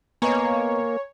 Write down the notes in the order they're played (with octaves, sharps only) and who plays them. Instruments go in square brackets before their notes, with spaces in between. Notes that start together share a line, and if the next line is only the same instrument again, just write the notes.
[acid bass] A#3 [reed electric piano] B3 B4 D#5 [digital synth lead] C#5 [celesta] G#5 A#5 C#6